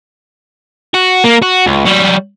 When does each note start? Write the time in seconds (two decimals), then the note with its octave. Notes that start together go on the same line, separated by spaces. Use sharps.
0.94 F#4
1.24 A#3
1.42 F#4
1.66 C#2
1.85 F#3 G3